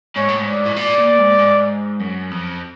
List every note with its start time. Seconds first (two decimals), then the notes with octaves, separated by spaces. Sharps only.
0.16 G#2 C#5
0.28 A2
0.40 G#2
0.46 D5
0.66 A2
0.77 A#2 D5
0.98 A#2
1.19 G#2
1.39 G#2
2.00 F#2
2.31 F2